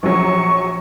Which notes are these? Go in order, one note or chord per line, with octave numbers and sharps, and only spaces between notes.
A#1 F#3 C#6